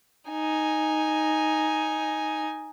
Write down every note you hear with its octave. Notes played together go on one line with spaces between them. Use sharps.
D#4 G#5